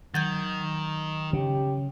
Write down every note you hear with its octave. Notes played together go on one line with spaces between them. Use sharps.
D#3 F#3 G6 G#6
C#3 G4